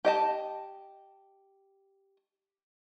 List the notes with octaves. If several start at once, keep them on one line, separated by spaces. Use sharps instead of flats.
G4 D#5 A5